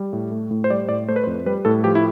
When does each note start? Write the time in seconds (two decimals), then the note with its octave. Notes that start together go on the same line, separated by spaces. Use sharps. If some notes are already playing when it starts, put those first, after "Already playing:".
Already playing: G3
0.13 A2
0.31 A3
0.51 A2
0.64 C5
0.70 G3 D5
0.89 A2 D5
1.09 A3 C5
1.16 B4
1.24 C5
1.27 F2
1.46 G3 B4
1.65 A2 A4
1.84 F3 G4
1.95 E4